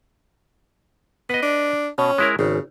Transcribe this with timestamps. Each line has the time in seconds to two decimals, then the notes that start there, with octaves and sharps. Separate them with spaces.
1.30 B3 B4 D#5
1.42 D4
1.98 B2 C#4
2.18 G#3 E4 A#4
2.39 G#1 C#3